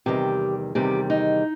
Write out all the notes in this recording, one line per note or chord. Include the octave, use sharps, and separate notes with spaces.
E2 C3 D#3 G3 G4
E2 C3 D#3 G3 G4
D#4